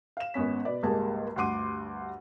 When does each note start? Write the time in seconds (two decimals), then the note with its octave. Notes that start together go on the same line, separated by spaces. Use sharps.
0.17 F5 E7
0.34 G#1 B3 C#4 B6
0.65 B2 B4 D5
0.83 G#1 C#2 G3 A#3 G#4 A5
1.36 D2 G2 F#5 C6 D6 D#7